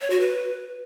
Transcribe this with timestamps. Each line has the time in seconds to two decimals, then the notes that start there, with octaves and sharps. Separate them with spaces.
0.01 C#5
0.10 F#4
0.20 B4